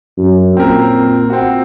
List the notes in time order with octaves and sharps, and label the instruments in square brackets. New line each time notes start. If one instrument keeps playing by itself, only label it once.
[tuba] F#2
[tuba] A#2 [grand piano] C4 A#4
[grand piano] C4 F#4